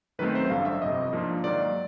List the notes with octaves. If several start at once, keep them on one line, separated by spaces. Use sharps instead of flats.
F#2 D#3 F#3 A3 C4 B4
C5
A1 G2 D3 F#3 F5
E5
G1 F2 C3 D#5
G#2 F3 A#3 D4
G#2 D#3 F#3 A#3 D5